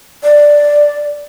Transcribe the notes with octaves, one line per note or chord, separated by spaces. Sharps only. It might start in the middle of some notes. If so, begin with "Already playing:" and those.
D5